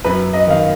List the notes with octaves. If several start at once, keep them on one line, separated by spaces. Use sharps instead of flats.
F#2 B4
D#5
D#3 F5